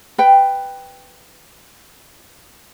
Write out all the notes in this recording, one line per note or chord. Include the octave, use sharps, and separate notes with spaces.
B4 G5